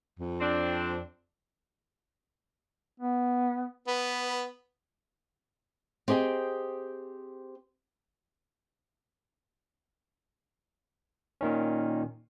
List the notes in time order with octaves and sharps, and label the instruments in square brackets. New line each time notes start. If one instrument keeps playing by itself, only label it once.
[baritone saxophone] F2
[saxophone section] C4 D4
[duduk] B3
[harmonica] B3 [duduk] B4
[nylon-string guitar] C4 G4 G#4 D#5 G5
[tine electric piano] A#2 D#3 C#4